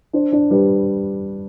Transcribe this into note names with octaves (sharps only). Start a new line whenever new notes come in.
D4 C5
D4
G3 B4